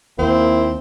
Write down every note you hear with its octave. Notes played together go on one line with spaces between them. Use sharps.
D#2 A#3 C4 E4